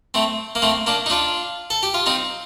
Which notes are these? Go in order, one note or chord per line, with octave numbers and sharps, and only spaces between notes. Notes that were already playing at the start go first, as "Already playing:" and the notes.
A3 C4
A#3
A3 C4
A#3 D4
D#4
D4 F4
A4
G4
F4
C4 D#4